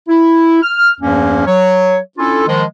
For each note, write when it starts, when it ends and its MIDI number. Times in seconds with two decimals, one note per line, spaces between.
0.08 0.61 64
0.62 0.93 89
1.00 1.44 40
1.00 1.44 43
1.00 1.44 53
1.00 1.44 58
1.00 1.44 61
1.45 1.97 54
1.45 1.97 73
2.18 2.45 61
2.18 2.45 62
2.18 2.45 64
2.18 2.45 65
2.18 2.45 69
2.47 2.63 51
2.47 2.63 53
2.47 2.63 56